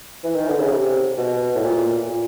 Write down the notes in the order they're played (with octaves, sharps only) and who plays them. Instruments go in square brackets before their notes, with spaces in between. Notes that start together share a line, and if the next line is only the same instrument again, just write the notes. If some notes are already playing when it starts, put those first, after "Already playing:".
[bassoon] E3
D#3
D3
C#3
C3
B2
A2
A#2
A#2